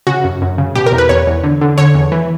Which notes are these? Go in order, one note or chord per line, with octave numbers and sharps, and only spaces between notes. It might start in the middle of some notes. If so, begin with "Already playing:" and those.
C#3 F#4
F#2
F#2
C#3
B2 G4
A#4
E2
B4
E2 C#5
E2
D3
D3
D3 C#5
E2
E3